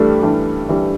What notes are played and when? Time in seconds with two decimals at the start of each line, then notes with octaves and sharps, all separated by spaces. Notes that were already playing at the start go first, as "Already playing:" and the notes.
Already playing: G2 E3 G3 A3 D4
0.23 G2 E3 G3 D4
0.68 G2 E3 G3 D4